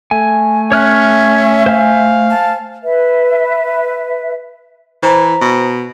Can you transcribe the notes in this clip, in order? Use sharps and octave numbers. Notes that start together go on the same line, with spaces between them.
A3 G#5
C#4 C#5 E5 F6 F#6
C5 F5 G#5
A5
B4 E5
E3 C5 A#5
B2